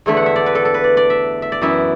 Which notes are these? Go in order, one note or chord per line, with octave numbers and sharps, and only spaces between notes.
E2 D3 A3 E4 E5
F#5
E5
D5
B4
A4
A4
B4
D5
D5
E5
E5
D5
F#2 E3 B3 E4 E5